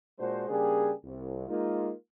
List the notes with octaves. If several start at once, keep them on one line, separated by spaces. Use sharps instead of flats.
A#2 G#3 D4 F#4 C5
C#3 G3 A#3 D4 G4 G#4
C2
G#3 A#3 D#4 F4